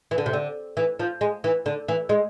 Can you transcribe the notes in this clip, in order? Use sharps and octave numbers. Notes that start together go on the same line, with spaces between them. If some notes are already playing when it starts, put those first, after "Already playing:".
E3
D3
C3
D3
E3
F3
G#3
E3
D3
E3
G#3